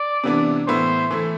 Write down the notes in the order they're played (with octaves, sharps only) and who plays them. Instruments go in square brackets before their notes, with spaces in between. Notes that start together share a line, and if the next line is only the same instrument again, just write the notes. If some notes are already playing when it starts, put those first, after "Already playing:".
Already playing: [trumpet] D5
[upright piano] C3 E3 B3 D4
[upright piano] A2 E3 B3 E4 [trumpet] C5
[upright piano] E3 A3 E4